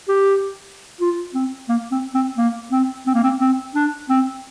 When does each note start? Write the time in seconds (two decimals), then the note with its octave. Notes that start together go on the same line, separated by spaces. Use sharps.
0.08 G4
1.01 F4
1.34 C4
1.69 A#3
1.92 C4
2.14 C4
2.38 A#3
2.72 C4
3.07 C4
3.15 A#3
3.24 C4
3.41 C4
3.75 D4
4.10 C4